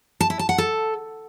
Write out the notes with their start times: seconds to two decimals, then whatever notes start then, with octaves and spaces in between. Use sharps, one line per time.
0.20 A5
0.30 E4
0.39 A5
0.49 F#5
0.58 A4